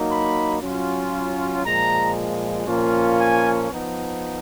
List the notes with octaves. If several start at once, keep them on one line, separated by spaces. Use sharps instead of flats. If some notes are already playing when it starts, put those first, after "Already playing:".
Already playing: F#3 A#3 D#4
B5
F#3 C#4 F4
A#2 F3 G#3 A#5
A#2 F3 A#3 C#4 F4
G#5
F3 B3 D#4